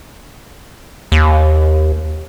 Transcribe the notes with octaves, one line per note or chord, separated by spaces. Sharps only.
D#2